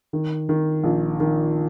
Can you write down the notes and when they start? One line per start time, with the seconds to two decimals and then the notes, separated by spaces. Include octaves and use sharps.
0.13 D#3
0.49 D#3
0.84 A#1
1.20 D#3